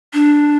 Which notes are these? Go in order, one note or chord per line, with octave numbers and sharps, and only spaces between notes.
D4